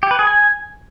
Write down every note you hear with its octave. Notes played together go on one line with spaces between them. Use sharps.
G4
B4
G#4
G#5